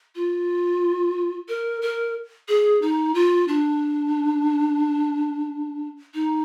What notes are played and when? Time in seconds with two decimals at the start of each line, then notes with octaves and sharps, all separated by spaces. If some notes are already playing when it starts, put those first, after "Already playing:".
0.15 F4
1.49 A#4
1.82 A#4
2.48 G#4
2.82 D#4
3.15 F4
3.48 D4
6.14 D#4